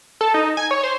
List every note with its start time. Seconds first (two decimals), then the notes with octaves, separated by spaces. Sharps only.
0.21 A4
0.34 D#4
0.57 G#5
0.71 C#5
0.83 C5